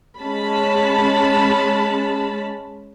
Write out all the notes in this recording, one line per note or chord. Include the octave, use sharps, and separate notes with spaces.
G#3 C#4 A5 B5